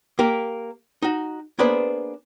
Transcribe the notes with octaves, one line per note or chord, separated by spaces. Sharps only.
A#3 G4 A#4
D#4 F#4
A#3 B3 D4 G#4 B4 C5